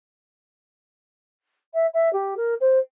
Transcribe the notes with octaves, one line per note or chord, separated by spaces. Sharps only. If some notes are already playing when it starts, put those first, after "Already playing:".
E5
E5
G4
A#4
C5